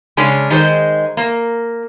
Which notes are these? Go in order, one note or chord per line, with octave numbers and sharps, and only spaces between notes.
C#3 G#3 C#4 D4
D#3 G#3 C5
A#3